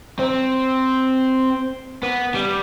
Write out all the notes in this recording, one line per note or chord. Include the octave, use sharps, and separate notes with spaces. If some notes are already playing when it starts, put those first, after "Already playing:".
C4
B3
G3